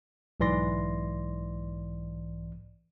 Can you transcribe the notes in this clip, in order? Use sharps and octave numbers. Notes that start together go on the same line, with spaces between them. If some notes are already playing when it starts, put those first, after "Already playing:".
B1 G#2 E3 D5 C6 A#6